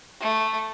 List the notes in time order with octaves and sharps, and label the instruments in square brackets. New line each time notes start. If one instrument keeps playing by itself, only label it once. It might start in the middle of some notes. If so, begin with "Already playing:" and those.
[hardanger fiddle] A3